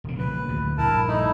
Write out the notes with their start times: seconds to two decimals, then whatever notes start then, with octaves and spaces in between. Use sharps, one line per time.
0.04 E1 C#3
0.18 A#1 A#2 C#3 B4
0.48 D2 A2
0.78 A#1 G2 E4 A#4 A5
1.08 A3 D#4 E4